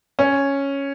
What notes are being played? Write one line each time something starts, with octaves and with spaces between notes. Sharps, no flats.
C#4